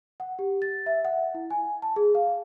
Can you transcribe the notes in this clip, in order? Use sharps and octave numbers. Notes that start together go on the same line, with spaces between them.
F#5
G4
A6
E5
F#5
E4
G#5
A5
G#4
F5